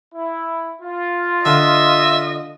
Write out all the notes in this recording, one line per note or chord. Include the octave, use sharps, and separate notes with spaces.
E4
F4
D3 D#5 E5